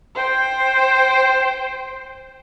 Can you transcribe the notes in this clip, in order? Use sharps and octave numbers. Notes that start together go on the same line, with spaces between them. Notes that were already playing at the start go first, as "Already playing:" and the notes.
C5 G5